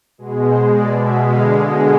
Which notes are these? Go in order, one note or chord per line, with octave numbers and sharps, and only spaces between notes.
B2 G#3
B2 G#3 C5
B2 G#3 D5
B2 G#3 E5
D3 G#3 F5
B2 G#3